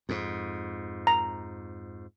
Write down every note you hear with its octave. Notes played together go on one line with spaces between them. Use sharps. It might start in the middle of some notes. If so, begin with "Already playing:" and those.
F2 G#2
A#5